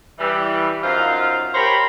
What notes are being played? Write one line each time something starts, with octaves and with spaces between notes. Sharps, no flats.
E3 G3
F#2 D#4 F4 C5 F5
G4 A#4 C5 C#5 A#5 B5